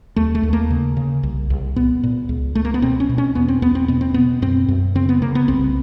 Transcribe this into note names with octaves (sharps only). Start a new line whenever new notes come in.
D#2 A3
A3
D#2
A#3
C#3
C#3
C2
C2
A#2 B3
A#2
C#2
C#2 A3
A#3
B3
B2 C4
C#4
B2
C#4
E2 B3
C4
E2 B3
C4
B2 B3
C4
B2 B3
F#2 C4
F#2
C#3 C4
B3
C#3 A#3
B3
C2 C4